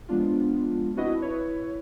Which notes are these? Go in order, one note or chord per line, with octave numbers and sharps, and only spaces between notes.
F3 G#3 B3 D4 F4
C4 D4 E4 F#4 B4 D#5
E4 B4 C#5